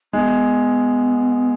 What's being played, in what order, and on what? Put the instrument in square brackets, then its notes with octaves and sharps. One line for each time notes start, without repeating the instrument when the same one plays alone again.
[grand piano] G#3 [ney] B3